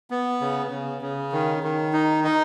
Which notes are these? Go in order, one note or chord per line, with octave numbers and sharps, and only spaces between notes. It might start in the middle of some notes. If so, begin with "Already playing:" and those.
B3
C#3
C#3
C#3
D#3
D#3
D#4
D#4